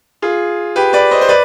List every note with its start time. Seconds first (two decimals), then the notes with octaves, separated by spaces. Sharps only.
0.22 F4 G#4
0.76 G4 B4
0.93 B4 D5
1.11 C5 D#5
1.21 C5
1.29 B4 D5